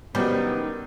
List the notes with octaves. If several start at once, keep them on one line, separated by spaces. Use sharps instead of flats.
C2 D#3 F#3 G3 B3 C#4